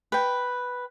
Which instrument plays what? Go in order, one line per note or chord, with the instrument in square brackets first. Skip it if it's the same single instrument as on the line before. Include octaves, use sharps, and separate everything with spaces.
[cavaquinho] B4 G5